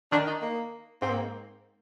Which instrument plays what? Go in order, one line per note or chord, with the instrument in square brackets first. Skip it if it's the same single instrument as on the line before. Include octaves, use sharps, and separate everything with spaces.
[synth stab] D#3 [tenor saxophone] D4
[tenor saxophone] D#4
A#3
[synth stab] G#2 [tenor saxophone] C4
[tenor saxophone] A#3